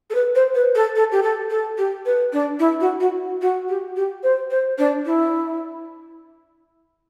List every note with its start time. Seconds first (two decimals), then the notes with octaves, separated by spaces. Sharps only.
0.10 A4
0.15 B4
0.35 C5
0.55 B4
0.75 A4
0.96 A4
1.12 G4
1.23 A4
1.50 A4
1.78 G4
2.06 B4
2.33 D4
2.59 E4
2.81 F#4
3.00 F#4
3.42 F#4
3.69 G4
3.97 G4
4.23 C5
4.50 C5
4.78 D4
5.06 E4